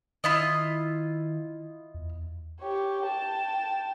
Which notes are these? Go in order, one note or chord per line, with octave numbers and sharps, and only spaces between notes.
D#3 E4 F4 D#5
E2
G4 C#5
G5 A5